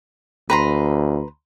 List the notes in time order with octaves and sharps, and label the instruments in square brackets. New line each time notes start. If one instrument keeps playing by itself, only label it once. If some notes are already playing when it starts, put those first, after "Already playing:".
[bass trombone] D2 [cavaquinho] B4 A#5 C6